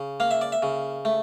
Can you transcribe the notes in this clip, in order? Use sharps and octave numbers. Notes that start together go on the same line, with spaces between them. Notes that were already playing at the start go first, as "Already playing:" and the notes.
Already playing: C#3
A#3 F5
E5
D5
E5
C#3
A3